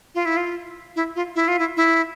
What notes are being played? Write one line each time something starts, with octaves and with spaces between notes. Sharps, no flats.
F4
E4
F4
E4
F4
E4
F4
E4
E4